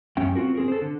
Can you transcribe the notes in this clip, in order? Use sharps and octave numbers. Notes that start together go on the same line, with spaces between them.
F#2 G3 C#4 E5 G5
C4 F4 F#4 A#4
C4 G#4 A#4
A4 C5
D3